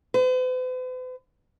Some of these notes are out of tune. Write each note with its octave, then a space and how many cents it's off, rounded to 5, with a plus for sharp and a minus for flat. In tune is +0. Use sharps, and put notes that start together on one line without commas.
B4 +45